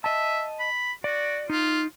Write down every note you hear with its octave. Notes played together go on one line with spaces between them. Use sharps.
D#5 E5 A5
B5
F#4 D5
D#4 F4